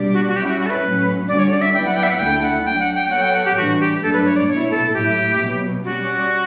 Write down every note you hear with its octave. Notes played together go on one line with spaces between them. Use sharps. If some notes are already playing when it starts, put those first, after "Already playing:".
Already playing: B2 G3 D4 G4 D5
F#4
F#4
G3 C#4 E4 G4
F#4
F#4
A4
B4
A2 F#3 C#4
D3 G3 C#4 F#4 D5
C#5
D5
E5
F#3 B3 E4 B4 D5 G5
F#5
G5
E5
F#5
D2 D3 A3 E4 A4 G5
F#5
F#3 A3 D4 G5
F#5
G5
F#3 B3 F#4 A4 C#5 F#5
G5
F#5
G4
A2 E3 G3 D4 F#4
G4
G2 F#3 A3 D4 A4
B4
C#5
D5
B2 A3 E4 C#5
A4
A2 F#3 A3 E4 G4
B2 F#3 B3
G3 C#4 F#4 G4 D5